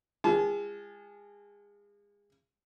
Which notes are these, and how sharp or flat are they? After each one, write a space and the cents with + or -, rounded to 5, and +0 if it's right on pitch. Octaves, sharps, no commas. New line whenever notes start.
G#3 -30 F4 -40 A5 -45